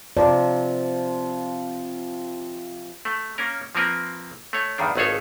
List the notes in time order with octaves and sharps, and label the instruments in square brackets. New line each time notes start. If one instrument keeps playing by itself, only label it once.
[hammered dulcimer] C3 F3 [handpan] D5
[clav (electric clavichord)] A3
A#3 C#4 A#4
F3 A#3 C4 A#4 B4
A3 C#5
E2 G2 D#3 D4
G#1 C#2 A3 G#4 A4 C#5